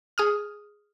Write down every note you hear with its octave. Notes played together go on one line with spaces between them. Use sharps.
G#4 D#6 F6